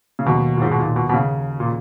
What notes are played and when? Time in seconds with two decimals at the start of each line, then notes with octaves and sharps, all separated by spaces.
0.19 C#3
0.26 D#2 B2 D#3 F#3 A#3
0.57 A#2
0.62 G#2
0.71 B2
0.80 A#2
0.96 B2
1.09 B2
1.14 C#3
1.60 A#2